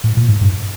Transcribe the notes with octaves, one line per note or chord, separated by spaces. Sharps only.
A2
A#2
G#2
G2